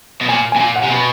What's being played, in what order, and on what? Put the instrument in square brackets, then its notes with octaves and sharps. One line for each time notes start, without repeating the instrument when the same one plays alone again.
[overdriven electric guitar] B2
[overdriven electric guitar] A#2 [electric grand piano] G#5
[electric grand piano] G#5
[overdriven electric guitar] B2
A#2
[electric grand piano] F#5
[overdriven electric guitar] C3
B2